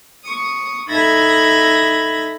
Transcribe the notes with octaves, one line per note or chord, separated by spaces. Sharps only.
C#6 D#6
D#4 A4 E5 B5 G#6 A#6